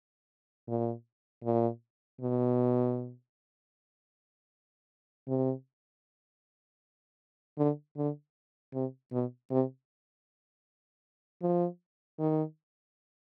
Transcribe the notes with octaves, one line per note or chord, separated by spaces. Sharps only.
A#2
A#2
B2
C3
D3
D3
C3
B2
C3
F3
D#3